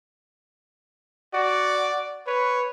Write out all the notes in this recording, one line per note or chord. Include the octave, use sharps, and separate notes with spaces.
F#4 D5
B4 C#5